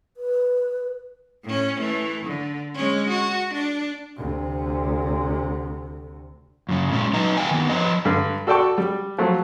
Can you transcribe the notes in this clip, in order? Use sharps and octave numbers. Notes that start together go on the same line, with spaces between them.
B4
A2 C#4
E3 A3
D3
G#3 C#4
F#4
D4
D2 C3
F#2 C#3
A#2 G#3 C#4
F#3 D#4 B4 D#5 A#5
G3 A3 F5 G5 G#5
D#3 B3
F3 B4 C#5 D#5
G2 D3
F#4 A4 D5 G5 A5 C#6
G3
F3 F#3 A3